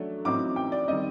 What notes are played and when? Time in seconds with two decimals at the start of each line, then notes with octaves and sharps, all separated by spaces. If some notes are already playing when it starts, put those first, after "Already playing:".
Already playing: F#3 A3 D4
0.25 A2 F#3 C4 D#4 D6
0.56 G5
0.72 D5
0.88 D#3 G3 C4 D#5